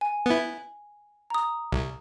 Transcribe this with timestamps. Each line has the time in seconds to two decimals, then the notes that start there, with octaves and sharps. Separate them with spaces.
0.01 G#5
0.26 B3 E4
1.30 A#5 D#6
1.72 C2